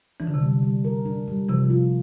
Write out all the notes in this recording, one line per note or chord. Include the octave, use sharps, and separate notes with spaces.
E3 D4
D3
C3 E3
G3
G3
A#4
D4
G3
C3 E3 F3
F4